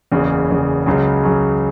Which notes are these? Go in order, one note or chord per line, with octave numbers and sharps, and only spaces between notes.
F#1 E2 C#3
F#1 E2 C#3
C#2 C#3 F#3
C#2 C#3 F#3